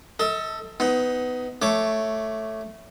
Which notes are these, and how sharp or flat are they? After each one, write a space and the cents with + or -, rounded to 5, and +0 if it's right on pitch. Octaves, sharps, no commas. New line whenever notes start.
A4 +15 D#5 +45
B3 +20 D#4 +20
A3 +0 C#5 +0 D6 +0